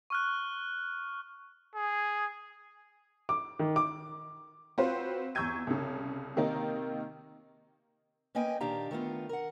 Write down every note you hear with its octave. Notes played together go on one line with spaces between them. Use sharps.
C#6 F6 F#6
G#4
D6
D#3
D6
C4 F4 F#4 B4 C5
E2 C#6 E6 G6 G#6 D#7
C2 C#3
C3 D#3 A#3 D#4 A#4
A#3 C#4 B4 D#5 G5 G#5
A#2 D#3 D4 G4 F5 A#5
D#3 A3 B3 F4
A#4 F#5